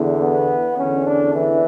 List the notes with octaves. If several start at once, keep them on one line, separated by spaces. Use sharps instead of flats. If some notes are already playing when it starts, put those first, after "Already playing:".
Already playing: E2 D3
B3
E2 D3 C#4
D4
E3